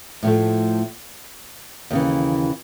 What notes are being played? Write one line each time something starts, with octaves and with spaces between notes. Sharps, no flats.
A2 F3 A3
D#2 C#3 E3